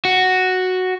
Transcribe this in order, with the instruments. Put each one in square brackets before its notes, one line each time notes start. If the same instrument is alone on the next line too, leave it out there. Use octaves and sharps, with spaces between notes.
[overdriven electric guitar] F#4